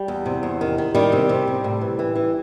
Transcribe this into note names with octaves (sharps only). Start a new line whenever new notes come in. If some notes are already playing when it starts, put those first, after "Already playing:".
Already playing: G3
E2
C3
E2
D#3
D#3
D#3 G3
C3
C3
C3
A2
E3
E3
E3